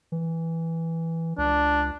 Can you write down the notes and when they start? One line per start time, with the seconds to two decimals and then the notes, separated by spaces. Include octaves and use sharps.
0.12 E3
1.38 C#2 D4